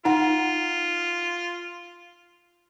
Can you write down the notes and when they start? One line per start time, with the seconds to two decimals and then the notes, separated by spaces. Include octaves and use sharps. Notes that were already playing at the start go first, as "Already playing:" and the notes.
0.05 D#4 F4 F#5